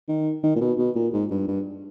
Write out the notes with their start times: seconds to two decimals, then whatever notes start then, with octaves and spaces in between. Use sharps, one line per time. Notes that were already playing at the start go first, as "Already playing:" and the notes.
0.08 D#3
0.43 D#3
0.56 A#2
0.61 B2
0.78 B2
0.96 A#2
1.13 G#2
1.31 G2
1.48 G2